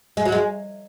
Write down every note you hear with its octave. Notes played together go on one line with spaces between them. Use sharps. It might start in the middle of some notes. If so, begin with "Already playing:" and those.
G#3
F#3
G#3